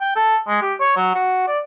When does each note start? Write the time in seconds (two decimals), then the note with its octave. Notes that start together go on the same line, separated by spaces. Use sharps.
0.01 G5
0.16 A4
0.48 G#3
0.62 G4
0.80 C#5
0.96 F#3
1.15 F#4
1.47 D5